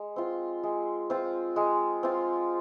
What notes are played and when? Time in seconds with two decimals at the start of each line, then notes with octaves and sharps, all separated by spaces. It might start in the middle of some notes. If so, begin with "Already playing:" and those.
Already playing: G#3
0.16 C4 F4
0.63 G#3
1.10 C4 F4
1.56 G#3
2.03 C4 F4